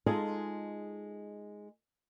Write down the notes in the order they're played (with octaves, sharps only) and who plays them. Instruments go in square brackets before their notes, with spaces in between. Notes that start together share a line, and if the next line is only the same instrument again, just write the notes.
[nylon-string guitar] G#3 D#4 F4 G#4 A4